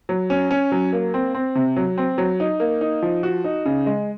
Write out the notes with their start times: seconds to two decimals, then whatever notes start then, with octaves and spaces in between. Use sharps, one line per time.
0.09 F#3
0.30 C#4
0.51 C#4
0.72 F#3
0.93 A#3
1.14 C4
1.34 C4
1.55 C3
1.76 F#3
1.98 C4
2.18 F#3
2.40 D#4
2.60 A#3
2.81 D#4
3.02 F3
3.23 F#4
3.44 D#4
3.65 C#3
3.86 G#3